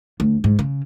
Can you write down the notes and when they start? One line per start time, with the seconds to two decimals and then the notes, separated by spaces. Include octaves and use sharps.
0.20 D2
0.44 G#2
0.59 C#3